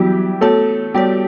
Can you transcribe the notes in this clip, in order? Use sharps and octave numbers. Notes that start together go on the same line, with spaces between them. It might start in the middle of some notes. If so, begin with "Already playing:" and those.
Already playing: E3 F#3 G3 B3 E4 F#4 G4
A3 B3 F#4 A4 C#5
G3 B3 F#4 G4 C#5